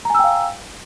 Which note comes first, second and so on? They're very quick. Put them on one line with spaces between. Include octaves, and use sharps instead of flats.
A#5 G#5 E6 G5 F5